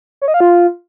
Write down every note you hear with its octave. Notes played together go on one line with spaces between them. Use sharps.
C#5
D#5
F5
F4